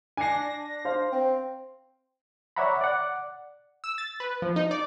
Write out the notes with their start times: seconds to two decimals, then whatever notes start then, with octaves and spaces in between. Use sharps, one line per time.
0.17 D4 G#5 A#6 C7
0.85 C5 F5
1.12 C4
2.56 C#5 D5 E5 F#5 A#5 B5
2.81 D5 F#5
3.84 E6
3.98 A6
4.20 B4
4.42 F3
4.56 D#4
4.71 D5